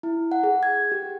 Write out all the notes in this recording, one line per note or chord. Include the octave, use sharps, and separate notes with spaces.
E4
F#5
G#4
G#6
G4